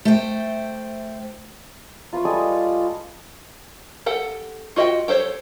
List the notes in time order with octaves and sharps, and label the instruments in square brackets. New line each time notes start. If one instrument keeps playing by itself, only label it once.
[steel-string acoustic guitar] A3 C5 G5
[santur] F4 B4 E5 C#6
G3 G#3 A4 D#6
[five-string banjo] G4 A4 F#5
F4 F#4 D#5 E5 G5
G4 A4 C5 C#5